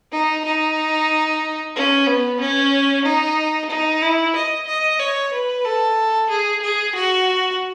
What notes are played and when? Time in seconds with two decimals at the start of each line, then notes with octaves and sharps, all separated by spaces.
0.12 D#4
0.44 D#4
1.76 C#4
2.07 B3
2.40 C#4
3.05 D#4
3.70 D#4
4.02 E4
4.35 D#5
4.67 D#5
5.00 C#5
5.33 B4
5.65 A4
6.29 G#4
6.62 G#4
6.95 F#4